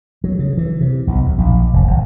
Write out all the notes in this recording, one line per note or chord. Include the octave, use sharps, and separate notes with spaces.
F#3
C#3
E3
C3
B1
D#2
A#1
F1
G#1